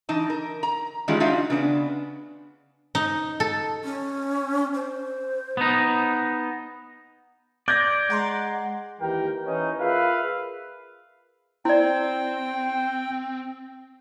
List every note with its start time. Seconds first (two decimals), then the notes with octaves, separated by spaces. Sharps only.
0.09 E3 D#4 A5
0.30 A#4
0.63 A#5
1.08 D#3 E3 G3 G#3 C#4 F4
1.20 D4 D#4 F4 F#4 E5 F5
1.50 C#3 B3 D4
2.95 D#4
3.40 A4
3.84 C#4
4.74 C5
5.57 B3 D#4
7.68 D5 G6 G#6 A#6
8.10 G#3 F#5 A#5 C6
9.01 D#2 E3 G4 A#4 G5
9.46 E3 C#4 D#4
9.79 F4 G#4 A#4 B4 E5 F5
11.65 C4 E4 D5 G5